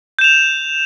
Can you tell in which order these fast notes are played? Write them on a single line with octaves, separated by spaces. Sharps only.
G6 E7 F7